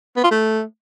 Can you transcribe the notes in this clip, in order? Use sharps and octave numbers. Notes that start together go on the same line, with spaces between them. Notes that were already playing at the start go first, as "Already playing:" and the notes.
B3
F4
A3